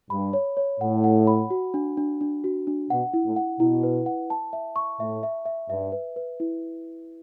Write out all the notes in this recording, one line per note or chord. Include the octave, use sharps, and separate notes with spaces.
G2 B5
C#5
C#5
A2 F#5
F#5
B5
F#4
D4
D4
D4
F#4
D4
B2 F#5
E4
A2
F#5
B2 E4
B4
F#5
A5
E5
C#6
A2 E5
E5
E5
G2 E5
B4
B4
E4